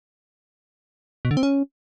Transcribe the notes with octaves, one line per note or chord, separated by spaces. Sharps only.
B2
D3
C4
C#4